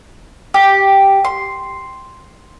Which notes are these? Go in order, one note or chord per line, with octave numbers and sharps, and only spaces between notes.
G4
C6